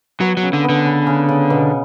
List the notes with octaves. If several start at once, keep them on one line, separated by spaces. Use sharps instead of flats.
F#3 B3
F#3
C#3
D3
D3 B3
C#3
C#3
C#3
B2